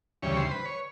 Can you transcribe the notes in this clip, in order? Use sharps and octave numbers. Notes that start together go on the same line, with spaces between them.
D2 C#3 E3 G3 C#5
C5
B4
C#5